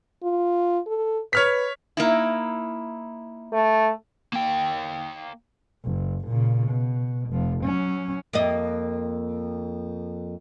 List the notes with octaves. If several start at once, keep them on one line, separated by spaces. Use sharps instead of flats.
F4
A4
B4 C#5 F6 B6
A#3 D#4 E4
A3
A#3 G5
F#1
A#2 C#3
B2
F1 F3
F#3 C#4
F2 A#3 D#5